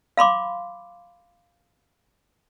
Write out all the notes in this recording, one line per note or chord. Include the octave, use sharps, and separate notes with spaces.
F5 B5 C6 D6